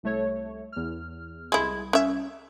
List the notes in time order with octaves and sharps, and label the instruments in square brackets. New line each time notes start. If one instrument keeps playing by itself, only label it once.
[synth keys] C2 A3 C#5
E2 F6
[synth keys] C2 G#6 [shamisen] G#3 E4
[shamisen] C#4 E5